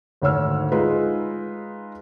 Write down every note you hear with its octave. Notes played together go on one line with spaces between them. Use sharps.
G#1 D2 C#5 E6 F6
G#3 D#4 F4 B4